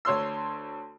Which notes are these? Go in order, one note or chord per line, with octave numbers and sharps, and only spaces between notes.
D2 C#5 C6 E6